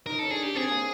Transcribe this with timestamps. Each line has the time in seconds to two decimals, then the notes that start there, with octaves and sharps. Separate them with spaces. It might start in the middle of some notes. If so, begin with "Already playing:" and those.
0.06 D#4 A#4
0.19 C#4 A4
0.31 D4 G#4
0.43 G4
0.55 C4 G#4
0.71 A#3